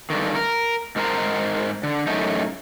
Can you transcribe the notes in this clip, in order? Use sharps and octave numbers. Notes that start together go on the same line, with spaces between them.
G2 D3 D#3
A#4
G#2 D#4 A#4 C5 A#5
D3
F#2 A2 C3 F#3 A3 D#4